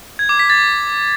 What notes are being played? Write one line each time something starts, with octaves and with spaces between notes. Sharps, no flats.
G#6
D6
B6
A6